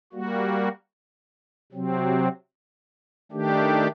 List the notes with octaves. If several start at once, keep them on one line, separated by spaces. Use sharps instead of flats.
G3 A#3 F#4
C3 F#3 C4
D#3 A3 D4 G4